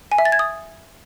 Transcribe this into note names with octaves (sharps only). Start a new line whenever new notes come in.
G#5
E5
A6
G#6
D#6